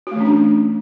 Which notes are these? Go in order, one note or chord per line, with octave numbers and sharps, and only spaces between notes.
E3 A3 C#4 D4 F#4